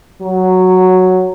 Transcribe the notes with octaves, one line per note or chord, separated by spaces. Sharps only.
F#3